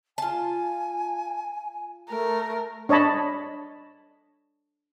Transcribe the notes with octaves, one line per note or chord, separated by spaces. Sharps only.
F4 G#5 A5
A3 A#4
D4 C#5 D#5 A5 B5